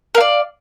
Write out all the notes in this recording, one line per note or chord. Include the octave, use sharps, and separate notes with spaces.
A#4 D5 F5